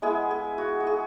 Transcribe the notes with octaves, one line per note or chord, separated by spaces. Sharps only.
G#3 B3 E4 G#4
G#4
F#4
F#4
G#4